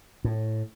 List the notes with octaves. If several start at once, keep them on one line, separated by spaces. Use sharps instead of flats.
A2